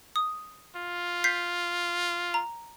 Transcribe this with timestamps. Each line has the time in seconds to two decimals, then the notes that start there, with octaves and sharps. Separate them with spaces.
0.16 D#6
0.76 F4
1.24 G6 B6 C7
2.34 A#5